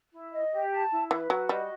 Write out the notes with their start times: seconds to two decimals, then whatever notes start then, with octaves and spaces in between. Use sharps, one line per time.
0.13 E4
0.32 D#5
0.52 G4
0.71 A5
0.91 E4
1.10 E3 B4
1.30 F#3 F#4
1.49 G3 D#5